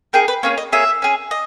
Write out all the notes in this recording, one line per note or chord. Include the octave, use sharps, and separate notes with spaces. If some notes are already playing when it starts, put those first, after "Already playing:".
A#3 D#4 G#4 G5
B4
A#3 C#4 G#4 C#5
D#5
A#3 C#4 G#4 E5
C#4 G#4
D#5